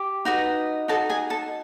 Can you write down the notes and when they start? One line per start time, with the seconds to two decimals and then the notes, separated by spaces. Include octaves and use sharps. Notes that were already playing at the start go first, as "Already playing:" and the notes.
Already playing: G4
0.25 D#4 F#4 B4 D#5
0.88 D#4 F#4 A4 D#5 A5
1.10 G#4 G#5
1.30 A4 A5